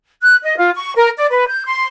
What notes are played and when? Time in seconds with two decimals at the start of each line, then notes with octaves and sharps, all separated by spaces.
0.22 F#6
0.43 D#5
0.57 F4
0.75 C#6
0.95 A#4
1.17 D5
1.30 B4
1.48 G6
1.65 C6